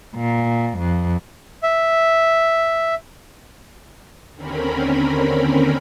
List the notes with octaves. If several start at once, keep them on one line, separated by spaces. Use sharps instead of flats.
A#2
F2
E5
D#2 D3 C4 C#4 A#4 B5